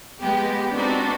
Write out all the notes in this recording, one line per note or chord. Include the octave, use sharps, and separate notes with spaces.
G#3 B3 G4
B3 C4 D4 D#4 F#4